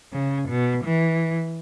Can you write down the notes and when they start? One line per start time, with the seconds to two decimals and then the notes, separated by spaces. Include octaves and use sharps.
0.13 C#3
0.48 B2
0.84 E3